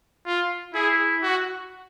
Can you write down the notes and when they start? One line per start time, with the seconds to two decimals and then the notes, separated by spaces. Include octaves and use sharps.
0.26 F4
0.74 E4 G#4
1.22 F#4